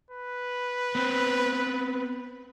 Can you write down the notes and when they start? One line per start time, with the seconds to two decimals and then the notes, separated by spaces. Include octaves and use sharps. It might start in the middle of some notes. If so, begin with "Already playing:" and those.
0.11 B4
0.95 B3 C4